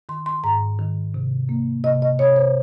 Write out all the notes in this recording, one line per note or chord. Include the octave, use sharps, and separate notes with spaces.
D#3 C6
C6
G#2 A#5
D#3
C3
A#3
C3 D#5
D#5
C3 C#5
C5